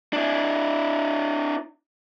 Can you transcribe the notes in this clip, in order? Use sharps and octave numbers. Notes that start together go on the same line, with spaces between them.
D4 E4